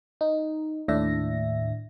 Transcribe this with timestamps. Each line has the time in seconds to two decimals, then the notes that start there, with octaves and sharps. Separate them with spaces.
0.21 D#4
0.88 D#2 A2 D4 E5 A#6